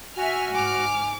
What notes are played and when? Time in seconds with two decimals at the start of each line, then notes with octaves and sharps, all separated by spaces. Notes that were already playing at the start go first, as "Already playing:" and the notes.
0.16 F#4 E5 G#5 F6
0.54 G#2 G#5 D6 F6